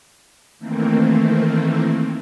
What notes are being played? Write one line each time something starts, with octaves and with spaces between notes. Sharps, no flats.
D#3 E3 A3 A#3 C4